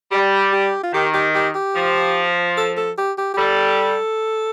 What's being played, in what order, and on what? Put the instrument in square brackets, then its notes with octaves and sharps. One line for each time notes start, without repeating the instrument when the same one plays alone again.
[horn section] G3 [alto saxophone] G4
[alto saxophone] G4
F4
[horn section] D#3 [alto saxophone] G4
[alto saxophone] G4
G4
G4
[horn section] F3
[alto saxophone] A4
A4
G4
G4
G4
[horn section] G3 [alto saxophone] A4